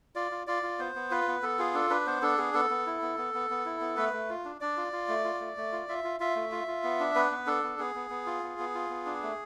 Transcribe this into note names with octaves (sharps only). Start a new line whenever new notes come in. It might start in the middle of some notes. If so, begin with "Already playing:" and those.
F4 D5
F4
F4 D5
F4
B3 C5
B3
F4 B4
B3
B3 A4
F4 G#4
D4 A4
D4 B4
B3 C5
D4 A4
B3 G#4
B3 A4
B3
E4
B3
B3
B3
B3
E4
B3
A3 B4
A3
F4
D4
D4 D5
F4
F4
A3
F4
A3
A3
F4
F4 E5
F4
F4 E5
A3
F4
F4
B3
D4
B3 B4
B3
D4 A4
B3
B3 G#4
B3
B3
F4
B3
B3
F4
B3
D4
A3